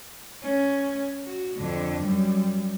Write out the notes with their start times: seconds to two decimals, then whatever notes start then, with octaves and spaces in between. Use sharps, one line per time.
0.43 C#4
1.24 F#4
1.57 F2 D3
2.03 F#2 G3